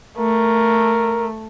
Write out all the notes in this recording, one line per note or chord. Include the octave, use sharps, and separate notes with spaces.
A3 A#4